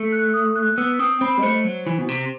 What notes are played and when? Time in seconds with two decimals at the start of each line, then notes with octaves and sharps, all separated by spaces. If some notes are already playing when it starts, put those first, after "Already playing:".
Already playing: A3
0.12 F#6
0.34 D#6
0.56 F#6
0.77 B3 E6
0.99 C4 D#6
1.21 C4 B5
1.38 G3 D#5
1.42 A3 C5
1.64 F#3
1.87 E3
1.98 B2
2.09 C3